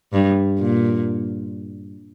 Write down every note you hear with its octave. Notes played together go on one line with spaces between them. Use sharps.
G2
A#2